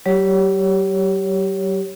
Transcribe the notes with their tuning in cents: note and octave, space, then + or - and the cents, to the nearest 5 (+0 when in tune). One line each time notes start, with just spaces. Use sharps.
F#3 +45 G4 -10 C#5 +0